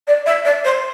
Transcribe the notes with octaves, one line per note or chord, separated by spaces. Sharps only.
D5
E5
D5
C5